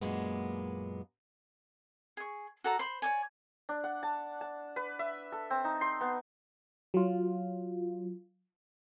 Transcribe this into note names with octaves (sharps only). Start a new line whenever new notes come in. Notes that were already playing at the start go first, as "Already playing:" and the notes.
F#2 A#2 G#3 A#3 B3
G#4 C#6
F#4 A4 D5 A#5
C5 B5 C6
C#5 D5 G#5
D4
F#5
A5
A5
B4
E5
A4
C4
D#4
C6
B3
F#3 F4